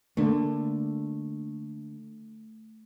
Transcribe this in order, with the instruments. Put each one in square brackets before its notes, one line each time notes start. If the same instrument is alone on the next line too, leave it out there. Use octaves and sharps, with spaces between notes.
[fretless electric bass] D3 A#3 [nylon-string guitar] A3